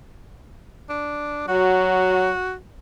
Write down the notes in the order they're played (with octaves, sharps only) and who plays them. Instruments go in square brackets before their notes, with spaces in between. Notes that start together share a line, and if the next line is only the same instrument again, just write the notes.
[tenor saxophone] D4
[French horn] F#3 [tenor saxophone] F#4